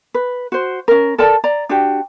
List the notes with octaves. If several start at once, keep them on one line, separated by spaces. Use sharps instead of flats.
B4
F#4 C5
C#4 A#4
A4 A#4 D5 A5
D5 A#5
D4 F#4 G4